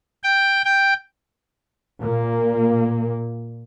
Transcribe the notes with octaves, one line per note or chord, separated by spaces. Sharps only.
G5
G5
A#2 A#3